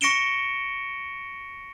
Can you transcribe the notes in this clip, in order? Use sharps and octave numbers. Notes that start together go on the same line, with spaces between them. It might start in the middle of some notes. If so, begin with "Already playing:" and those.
C#6 A#6 C#7 D7 E7 G7